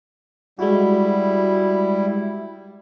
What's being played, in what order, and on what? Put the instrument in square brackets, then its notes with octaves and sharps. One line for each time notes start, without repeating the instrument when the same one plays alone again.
[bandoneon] G3 E4 [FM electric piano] G#3 F#4